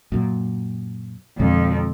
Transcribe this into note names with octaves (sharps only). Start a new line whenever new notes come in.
F#2 A#2
F2 B2 D3 G#3